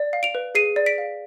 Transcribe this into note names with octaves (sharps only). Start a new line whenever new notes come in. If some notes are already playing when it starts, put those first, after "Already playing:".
Already playing: D5
F5
D7 F7
B4
G#4 C7 D#7
D5
B6 D7
F5